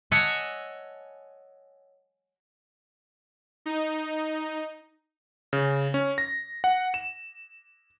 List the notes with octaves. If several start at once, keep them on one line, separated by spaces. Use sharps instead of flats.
C#5 D#5 E5 F#5 G#5 A5
D#4
C#3
C#4
A#6
F#5
E7